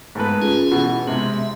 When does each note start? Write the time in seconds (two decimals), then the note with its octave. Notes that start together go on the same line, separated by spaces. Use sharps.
0.15 G#2 A3 B4
0.42 C#4 F4 G#4
0.71 B2 E3
1.07 C3 G#3 B3
1.34 E5